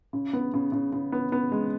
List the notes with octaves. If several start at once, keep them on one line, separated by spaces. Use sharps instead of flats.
C#3
B3
C#3
C#3
C#3
B3
B3
G#3